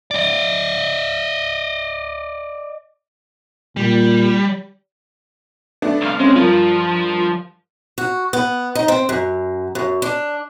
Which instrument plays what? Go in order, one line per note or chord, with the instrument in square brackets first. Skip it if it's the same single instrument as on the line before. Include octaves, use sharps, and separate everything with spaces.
[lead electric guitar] D5 D#5
[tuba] A#2 [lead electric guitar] G3
[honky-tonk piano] A3 B3 D4
[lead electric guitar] C2 F5
[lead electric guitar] G#3 [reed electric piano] C4 C#4
[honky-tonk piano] G2 A#4 [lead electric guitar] F3 [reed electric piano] F4
[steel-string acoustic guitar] F#4
B3
D#4
C4
F#2
F#2
D4